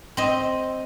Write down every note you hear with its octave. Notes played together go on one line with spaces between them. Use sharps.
C4 D#5